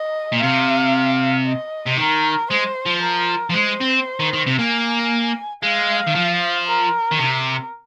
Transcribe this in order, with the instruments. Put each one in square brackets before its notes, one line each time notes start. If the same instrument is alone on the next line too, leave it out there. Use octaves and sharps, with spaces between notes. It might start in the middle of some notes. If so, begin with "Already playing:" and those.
Already playing: [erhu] D#5
[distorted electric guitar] A#2
[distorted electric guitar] C3 [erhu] F5
[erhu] D#5
[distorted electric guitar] C3
[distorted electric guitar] D#3 [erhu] A#4
[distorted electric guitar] G#3 [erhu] C5
[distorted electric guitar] F3
[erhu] A#4
[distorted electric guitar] F3
[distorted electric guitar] G#3 [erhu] C5
[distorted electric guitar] C4
D#3
D#3
C3
[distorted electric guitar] A#3 [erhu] G#5
[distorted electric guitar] G#3 [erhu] F5
[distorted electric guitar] D#3
F3
[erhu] A#4
[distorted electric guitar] D#3
[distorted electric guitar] C3 [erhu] A#4